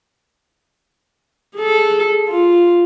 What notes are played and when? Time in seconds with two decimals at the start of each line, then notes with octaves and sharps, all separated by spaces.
1.55 G#4 A4
2.28 F4